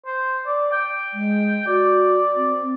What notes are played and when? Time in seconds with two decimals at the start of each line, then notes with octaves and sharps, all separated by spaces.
0.06 C5
0.47 D5
0.72 G5
1.13 G#3
1.67 F#4 D5
2.36 C4